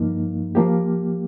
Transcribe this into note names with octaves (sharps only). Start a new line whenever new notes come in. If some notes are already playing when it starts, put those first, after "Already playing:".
Already playing: G2 F3 A#3 D#4
F3 A#3 G4